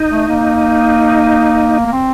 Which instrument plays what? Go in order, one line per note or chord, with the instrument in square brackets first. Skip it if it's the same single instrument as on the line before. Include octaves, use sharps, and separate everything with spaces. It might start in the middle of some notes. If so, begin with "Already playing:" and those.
Already playing: [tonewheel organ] D#4
[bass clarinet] A3
A#3
A#3
C4